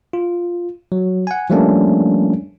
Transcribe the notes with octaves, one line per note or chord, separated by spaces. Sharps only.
F4
F#3
F#5 G#5
F3 G3 A3 A#3 C#4 D4